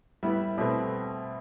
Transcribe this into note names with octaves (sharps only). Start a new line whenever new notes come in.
A2 G3 B3 E4 E5
B2 A3 C4